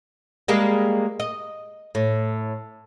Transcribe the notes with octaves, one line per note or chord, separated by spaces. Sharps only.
G3 G#3 A#3
D#5
A2